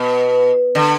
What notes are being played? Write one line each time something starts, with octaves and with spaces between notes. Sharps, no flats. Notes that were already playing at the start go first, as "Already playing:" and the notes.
Already playing: B2
D3